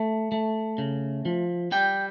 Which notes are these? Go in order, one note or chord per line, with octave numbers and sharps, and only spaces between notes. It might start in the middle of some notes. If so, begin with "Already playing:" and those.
Already playing: A3
A3
C#3
F3
G3 G5